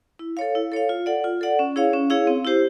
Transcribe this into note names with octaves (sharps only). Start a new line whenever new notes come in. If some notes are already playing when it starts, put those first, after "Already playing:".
E4
A4 C#5 F5
E4
A4 C#5 F5
F4
A4 D5 F#5
F4
A4 D5 F#5
C#4
E4 G#4 C#5 F5
C#4
E4 G#4 C#5 F5
C4
E4 G4 C5